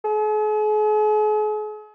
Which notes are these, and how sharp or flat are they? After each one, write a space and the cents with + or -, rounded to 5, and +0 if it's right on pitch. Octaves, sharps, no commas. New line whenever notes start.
G#4 +45